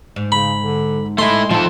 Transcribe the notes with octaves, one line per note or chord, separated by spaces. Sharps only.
G#2
C#3 B5
D3
G#3 A3 E4 C6
D#3 F3 E4 A4